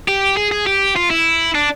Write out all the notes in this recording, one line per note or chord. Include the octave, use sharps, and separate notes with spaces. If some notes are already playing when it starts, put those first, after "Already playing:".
G4
G#4
G#4
G4
F4
E4
D4